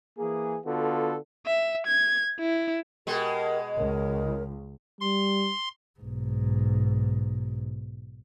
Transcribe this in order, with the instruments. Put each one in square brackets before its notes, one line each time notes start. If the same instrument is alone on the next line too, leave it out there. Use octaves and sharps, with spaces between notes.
[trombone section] E3 A#3 G#4
D3 B3 F4 F#4 A4
[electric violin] E5
G#6
E4
[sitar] B2 G#3 [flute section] G4 A#4 G5
[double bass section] C#2 [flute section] A#4 C#5
[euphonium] G3 [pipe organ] C6
[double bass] B1 G#2